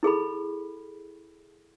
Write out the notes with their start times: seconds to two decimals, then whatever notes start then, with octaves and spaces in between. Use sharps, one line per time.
0.03 E4 G#4 A4 B5